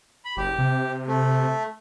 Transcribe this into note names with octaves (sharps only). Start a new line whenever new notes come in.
B5
F#1 G4
C3
A3